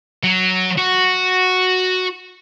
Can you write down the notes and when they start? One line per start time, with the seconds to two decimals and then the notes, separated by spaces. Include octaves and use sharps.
0.23 F#3
0.78 F#4